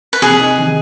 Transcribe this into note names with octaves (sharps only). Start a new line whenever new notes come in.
B4
C3 G#4
D#4
D#3